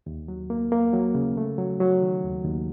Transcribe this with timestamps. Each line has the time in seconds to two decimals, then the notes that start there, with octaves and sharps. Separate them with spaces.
0.06 D#2
0.28 F#3
0.50 A#3
0.72 A#3
0.93 F#3
1.15 C#3
1.37 A3
1.58 F#3
1.80 F#3
2.02 D#3
2.24 D#2
2.45 D#2